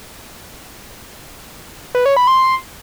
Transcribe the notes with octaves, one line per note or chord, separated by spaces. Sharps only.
B4
C#5
B5
C6